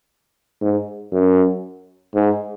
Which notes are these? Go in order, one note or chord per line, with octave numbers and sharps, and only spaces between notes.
G#2
F#2
G#2